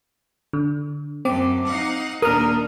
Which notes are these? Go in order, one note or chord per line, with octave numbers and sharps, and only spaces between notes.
D3
F#2 A3 C4 D6
D#4 F5 F#5
D#2 A#2 D4 A#4 D#6 F6